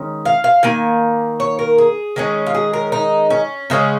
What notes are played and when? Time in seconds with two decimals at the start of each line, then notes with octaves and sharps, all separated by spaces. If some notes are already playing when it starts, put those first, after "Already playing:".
Already playing: D#3 G#3 C#4
0.25 F5
0.44 F5
0.63 D#3 A#3 G#5
1.40 C#5
1.59 A#4
1.78 G#4
2.16 D#3 G#3 C#4
2.46 F4
2.54 G#4
2.73 A#4
2.92 D#4
3.30 C#4
3.70 C#3 G#3 C#4